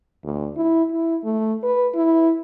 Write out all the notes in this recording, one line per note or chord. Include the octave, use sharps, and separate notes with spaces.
D2
E4
E4
A3
B4
E4